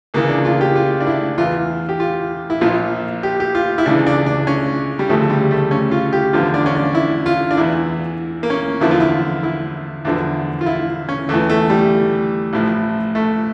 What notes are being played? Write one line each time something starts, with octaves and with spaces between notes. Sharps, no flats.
C#2 C#3 E3 A#3
D4
F4
G4
F4
D4
E4
E2 E3 F4
G4
F4
E4
A#1 A#2 F3 F4
G4
G4
F4
E4
C#2 C#3 E3 D4
D4
D4
C#4
G3
D2 C#3 F3 A3
G3
A3
C#4
F4
G4
E2 D3 F3 F4
D4
C#4
D4
E4
F4
D4
E2 E3 E4
A#3
C#4
E2 D3 F3 E4
F4
E4
E4
E2 D3 F3
F4
E4
C#4
E2 E3 A3
A3
G3
A1 A2 F3
A3